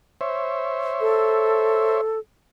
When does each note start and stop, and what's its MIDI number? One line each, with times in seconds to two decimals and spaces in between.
0.21 2.01 72
0.21 2.01 73
0.21 2.01 76
1.01 2.19 69